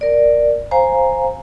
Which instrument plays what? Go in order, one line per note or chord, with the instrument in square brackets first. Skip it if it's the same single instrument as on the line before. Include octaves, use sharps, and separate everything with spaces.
[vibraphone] A#4 D5
C5 F5 G#5 A#5